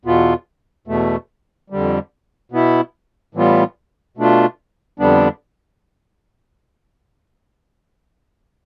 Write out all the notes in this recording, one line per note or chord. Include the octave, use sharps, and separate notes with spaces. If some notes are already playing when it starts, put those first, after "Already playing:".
E2 B2 B3 F4
E2 B2 A3
F2 D3 G3
B2 B3 E4
A2 E3 G3 B3 F4
B2 A3 D4 F4
F2 D3 G3 B3 D4